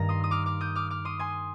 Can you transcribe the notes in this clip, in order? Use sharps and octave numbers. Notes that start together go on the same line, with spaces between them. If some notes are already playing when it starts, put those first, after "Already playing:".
Already playing: G2 D#3 A#3 A#5
C6 D#6
D#6
D6 F6
D6 F6
D#6 G6
D6 F6
D6 F6
C6 D#6
G#5 C6